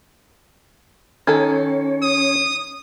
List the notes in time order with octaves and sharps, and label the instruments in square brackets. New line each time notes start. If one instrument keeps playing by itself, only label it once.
[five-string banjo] D#3 A4 [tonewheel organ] C#4 C#5
[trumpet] D#6